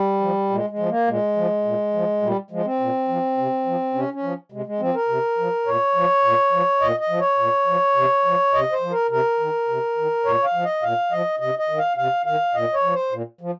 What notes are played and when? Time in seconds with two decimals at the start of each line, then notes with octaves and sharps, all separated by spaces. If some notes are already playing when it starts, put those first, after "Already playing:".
Already playing: G3
0.21 F3
0.50 A#2 G#3
0.70 G#3
0.79 F3
0.89 A#3
1.07 A#2 G#3
1.37 F3
1.65 A#2
1.94 F3
2.22 A#2 G3
2.51 F3 G#3
2.65 C4
2.80 A#2
3.08 F3
3.38 C3
3.66 F3
3.94 C3 C#4
4.13 C#4
4.23 F3
4.52 C3 G#3
4.66 G#3
4.80 F3 C4
4.95 A#4
5.09 C3
5.38 F3
5.66 A#2 C#5
5.95 F3
6.24 A#2
6.52 F3
6.81 A#2 D#5
7.00 D#5
7.09 F3
7.19 C#5
7.39 A#2
7.67 F3
7.96 C3
8.25 F3
8.54 C3 D#5
8.72 C5
8.82 F3
8.91 A#4
9.10 C3 A#4
9.39 D#3
9.69 C3
9.97 D#3
10.25 A#2 C#5
10.44 F5
10.54 F3
10.64 D#5
10.83 A#2 F5
11.12 F3 D#5
11.40 C3 D#5
11.59 D#5
11.69 D#3
11.78 F5
11.97 C3 F5
12.26 D#3 F5
12.55 A#2 D#5
12.74 C#5
12.83 F3
12.93 C5
13.12 A#2
13.41 F3